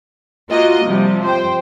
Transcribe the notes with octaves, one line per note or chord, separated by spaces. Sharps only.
A#3 F4 F#4 D#5
C3 F3 G3
C5 G5